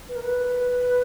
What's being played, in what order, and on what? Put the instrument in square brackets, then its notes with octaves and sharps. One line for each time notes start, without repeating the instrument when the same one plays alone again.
[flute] B4
A#4
B4